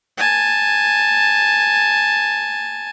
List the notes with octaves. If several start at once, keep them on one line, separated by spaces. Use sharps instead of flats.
G#5 A5